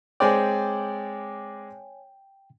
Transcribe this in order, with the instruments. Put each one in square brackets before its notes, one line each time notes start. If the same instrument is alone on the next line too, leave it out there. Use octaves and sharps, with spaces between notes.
[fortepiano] G#3 C4 D5 [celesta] C#5 G#5 [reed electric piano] G5